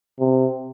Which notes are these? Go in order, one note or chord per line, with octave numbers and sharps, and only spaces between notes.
C3